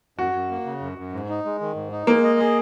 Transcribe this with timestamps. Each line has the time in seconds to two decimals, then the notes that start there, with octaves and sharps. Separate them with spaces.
0.18 F#2 F#4
0.34 F#2
0.50 A#3
0.65 C#3
0.81 F#2
0.98 F#2
1.12 G#2
1.29 D#4
1.45 G#3
1.61 D#3
1.75 G#2
1.91 D#4
2.07 G#3 A#3
2.23 D#5
2.39 G#4